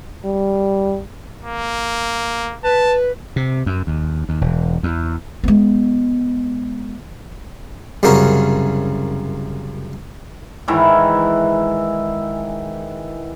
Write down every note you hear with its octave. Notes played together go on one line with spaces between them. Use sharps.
G3
A#3
B4 A5
C3
F#2
D#2
D#2
E1
E2
G#3 B3
C2 F#2 C#3 F#4 A#4
G#2 D#3 E3 E4